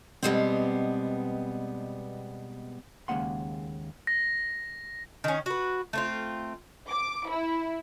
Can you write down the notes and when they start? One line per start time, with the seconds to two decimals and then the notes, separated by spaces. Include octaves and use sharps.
0.23 B2 F3 G3 G#3 B3 C4
3.08 D#2 C#3 G#3 A#3 F#5 C6
4.07 A#6
5.24 D#3 C#4
5.46 F#4 B4
5.93 A3 C4 F4
6.88 D6
7.28 E4